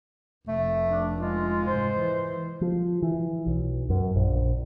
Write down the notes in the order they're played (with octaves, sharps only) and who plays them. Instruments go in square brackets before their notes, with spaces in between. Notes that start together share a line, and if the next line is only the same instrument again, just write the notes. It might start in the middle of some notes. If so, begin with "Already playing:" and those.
[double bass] F1 [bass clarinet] A3
[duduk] D4
[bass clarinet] G#3 [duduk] F4
[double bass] G#2 [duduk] C5
[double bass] E3
[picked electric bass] F3
E3
B1
F#2
A#1